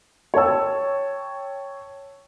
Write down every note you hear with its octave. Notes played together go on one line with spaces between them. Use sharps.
C#5 G5 A5 E6